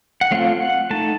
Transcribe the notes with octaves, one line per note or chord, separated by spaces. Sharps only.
F#5
F#3 A3 C4 F4 F5
F#5
A3 D#4 A5